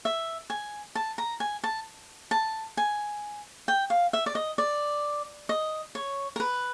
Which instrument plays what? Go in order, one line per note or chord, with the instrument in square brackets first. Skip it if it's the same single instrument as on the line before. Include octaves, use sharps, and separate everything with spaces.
[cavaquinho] E5
G#5
A5
A#5
G#5
A5
A5
G#5
G5
F5
E5
D5
D#5
D5
D#5
C#5
A#4
B4